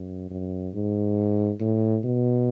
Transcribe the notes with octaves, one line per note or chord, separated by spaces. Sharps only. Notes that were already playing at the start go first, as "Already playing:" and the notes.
Already playing: F#2
F#2
G#2
A2
B2